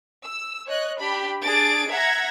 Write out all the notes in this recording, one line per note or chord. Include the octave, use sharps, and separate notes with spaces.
E6
C#5 D#5 F#6
D4 G4 B5
D4 G#4 A6 D7
E5 F#5 A#5 G#6 A#6